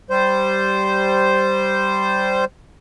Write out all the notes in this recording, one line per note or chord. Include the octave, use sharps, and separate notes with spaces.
G3 C5